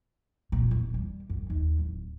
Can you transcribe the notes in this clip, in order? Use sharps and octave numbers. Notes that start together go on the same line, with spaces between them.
A#2
E1
G3
F#2
D#2
D1